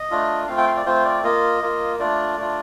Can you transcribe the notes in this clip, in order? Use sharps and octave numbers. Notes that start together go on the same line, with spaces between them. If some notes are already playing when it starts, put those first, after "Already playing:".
Already playing: D#5
A3 D4 F4
A3 C4 F4 F5
G5
F5
D5
A3 C4 F4 C5
D5
A#3 F4 D#5
A#3 F4
A3 D4 F4 D5
A3 D4 F4